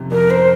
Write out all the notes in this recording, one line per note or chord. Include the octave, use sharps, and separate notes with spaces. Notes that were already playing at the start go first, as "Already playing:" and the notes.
Already playing: F2 C3
F2 A#4
C5